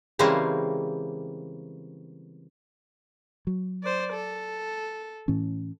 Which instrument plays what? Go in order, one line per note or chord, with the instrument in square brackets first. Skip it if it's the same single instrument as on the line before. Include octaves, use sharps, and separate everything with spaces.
[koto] C#3 E3 G3 G#3 A#3 C4
[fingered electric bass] F#3
[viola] C5 D5
A4
[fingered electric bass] A2 E3 C#4